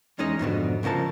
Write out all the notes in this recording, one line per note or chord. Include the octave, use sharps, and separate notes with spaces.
E2 G#3 C#4 D#4 G#4 D#5
F2 G#2 B2 D3
C2 C#3 F3 A#4 A5